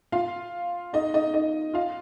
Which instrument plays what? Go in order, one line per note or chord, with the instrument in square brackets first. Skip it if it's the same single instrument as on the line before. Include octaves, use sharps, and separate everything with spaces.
[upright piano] F4 F5
D#4 D#5
D#4 D#5
D#4 D#5
F4 F5